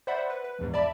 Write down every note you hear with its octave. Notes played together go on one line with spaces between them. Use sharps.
C5 D5 E5 F#5 B5
B4
B4
A#1 E2 G#2
D5 E5 A5 B5